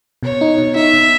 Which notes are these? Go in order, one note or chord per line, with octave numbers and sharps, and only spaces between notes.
B2 C#5
D#4
B2
D#4 E5
B2